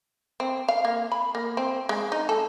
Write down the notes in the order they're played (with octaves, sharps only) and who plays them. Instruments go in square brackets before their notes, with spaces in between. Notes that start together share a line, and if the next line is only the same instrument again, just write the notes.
[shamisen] C4
F5
A#3
B5
A#3
C4
G#3
D#4
A4